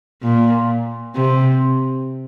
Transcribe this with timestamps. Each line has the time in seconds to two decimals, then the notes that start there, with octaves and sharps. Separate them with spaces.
0.23 A#2
1.16 C3